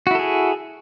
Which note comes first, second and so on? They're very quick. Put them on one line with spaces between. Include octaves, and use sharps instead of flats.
F#4 E4 A4 G#4